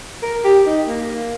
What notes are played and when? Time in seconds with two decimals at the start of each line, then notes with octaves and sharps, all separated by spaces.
0.22 A#4
0.44 G4
0.66 D#4
0.88 A#3